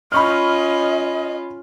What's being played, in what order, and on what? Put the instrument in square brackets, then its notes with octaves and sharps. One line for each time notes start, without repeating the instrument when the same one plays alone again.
[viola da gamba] C#4 F4 [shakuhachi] D#5 [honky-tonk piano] B5 C#6 F6